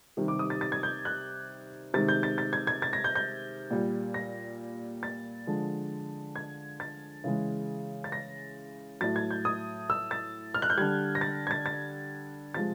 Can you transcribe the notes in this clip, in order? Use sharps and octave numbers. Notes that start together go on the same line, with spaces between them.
C3 D#3 G3
D6
D#6
A6
A6
G#6
G6
F#6
C3 D#3 G#3 A6
G6
A6
A6
G#6
G#6
A6
A#6
G6
G6
A#2 G3
A#6
A6
D3 F3 G#3
G#6
A6
C#3 E3 G#3
A6
A#6
A2 F#3 A6
G#6
G6
D#6
E6
A6
F6
F#6
G6
D3 G3 G#6
A#6
A6
G#6
A6
A6
C3 F3 G#3 A6